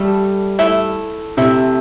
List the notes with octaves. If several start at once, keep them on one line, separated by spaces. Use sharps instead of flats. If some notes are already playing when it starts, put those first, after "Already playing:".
Already playing: G3 A3 A4
A3 E4 A4 E5
C3 A3 E4 A4 E5